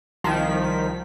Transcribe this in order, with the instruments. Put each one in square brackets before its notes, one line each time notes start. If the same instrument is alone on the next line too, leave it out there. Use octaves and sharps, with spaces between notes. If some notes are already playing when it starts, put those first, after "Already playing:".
[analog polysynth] C2 D#3 F3 B6